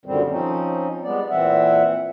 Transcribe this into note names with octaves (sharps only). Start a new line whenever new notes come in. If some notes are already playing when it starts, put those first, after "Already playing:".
F#2 A#2 D3 D#3 G3 C4
F3 C4 C#4 D#4
G3 G#3 B3 D5
A#2 E3 C4 E5 F#5